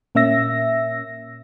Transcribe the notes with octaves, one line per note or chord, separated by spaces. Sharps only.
A#2 A#3 C#4 E5 E6 A#6